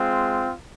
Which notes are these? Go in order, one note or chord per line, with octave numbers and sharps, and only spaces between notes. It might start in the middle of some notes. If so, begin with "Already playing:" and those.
Already playing: G#3 C4 F4